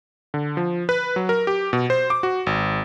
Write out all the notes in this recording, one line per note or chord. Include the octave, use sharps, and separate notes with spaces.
D3
F3
B4
F#3
A#4
G4
B2
C5
D6
F#4
G#1